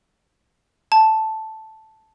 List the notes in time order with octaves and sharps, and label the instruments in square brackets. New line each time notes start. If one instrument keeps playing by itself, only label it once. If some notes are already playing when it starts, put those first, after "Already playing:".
[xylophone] A5